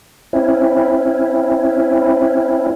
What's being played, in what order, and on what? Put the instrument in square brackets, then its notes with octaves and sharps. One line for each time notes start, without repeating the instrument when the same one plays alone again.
[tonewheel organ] C4 C#4 E4